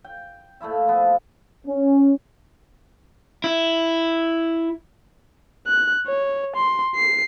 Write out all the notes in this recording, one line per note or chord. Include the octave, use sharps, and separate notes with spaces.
G5
A#2 A3 E4 E5
F3 B3
C#4
E4
F#6
C#5
C6
C7